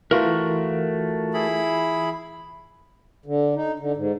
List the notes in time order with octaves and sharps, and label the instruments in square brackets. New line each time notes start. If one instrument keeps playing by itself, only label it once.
[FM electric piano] E3 F4 [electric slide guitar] A3 F#4 A#4
[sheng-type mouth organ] E4 G#4 B5
[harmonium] D3
D#4
D3
G#2